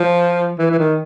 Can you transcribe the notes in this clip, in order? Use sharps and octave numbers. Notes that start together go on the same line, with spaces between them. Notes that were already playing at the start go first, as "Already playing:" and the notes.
Already playing: F3
E3
E3
D#3